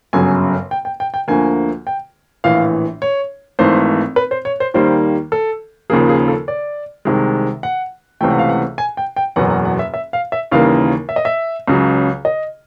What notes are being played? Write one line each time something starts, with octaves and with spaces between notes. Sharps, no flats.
G1 F#2 C#3 F#3 G#5
G5
G5
G5
G5
D2 D3 F3 A#3 G#5
G5
A#1 A2 E3 F5
C#5
G#1 G#2 E3 A3 C5
B4
C5
C#5
C5
D#2 D#3 G3 A#3 C5
A4
D#2 C#3 F3 A#3 G#4
G#4
A4
D5
C2 C3 D#3 G#3
F#5
C#2 C3 E3 A3 G5
F#5
F5
F#5
G#5
G5
G5
F#1 E2 B2 F#3 F#5
F#5
F#5
E5
E5
F5
E5
D#2 C#3 E3 G3 A#3 F5
E5
D#5
E5
C#2 C#3 F#3
D#5